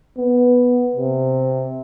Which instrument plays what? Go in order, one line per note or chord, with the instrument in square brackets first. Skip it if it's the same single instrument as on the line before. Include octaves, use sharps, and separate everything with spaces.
[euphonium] B3
C3